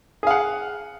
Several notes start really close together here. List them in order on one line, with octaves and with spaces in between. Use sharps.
G#4 F5 F#5